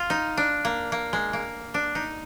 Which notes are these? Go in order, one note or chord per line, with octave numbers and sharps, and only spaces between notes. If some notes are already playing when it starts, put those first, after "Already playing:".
Already playing: F4
D#4
D4
A#3
A#3
G#3
A#3
D4
D#4